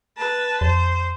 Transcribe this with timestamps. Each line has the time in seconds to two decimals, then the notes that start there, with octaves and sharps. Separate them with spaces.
0.18 B4 A5
0.61 F2 C5